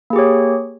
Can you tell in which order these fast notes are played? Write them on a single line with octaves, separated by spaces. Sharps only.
A#3 G#4 G4 C#5